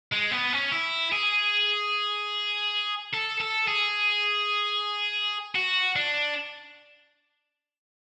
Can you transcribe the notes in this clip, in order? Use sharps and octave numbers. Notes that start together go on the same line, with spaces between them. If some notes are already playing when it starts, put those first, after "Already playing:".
G#3
B3
C#4
E4
G#4
A4
A4
G#4
F#4
D4